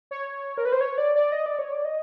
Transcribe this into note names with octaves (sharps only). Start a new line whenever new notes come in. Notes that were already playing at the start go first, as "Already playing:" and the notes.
C#5
A#4
B4
C5
C#5
D5
D5
D#5
D5
C#5
D5
D#5